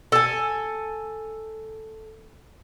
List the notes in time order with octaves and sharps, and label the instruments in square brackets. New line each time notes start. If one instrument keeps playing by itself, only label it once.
[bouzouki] A4 G#5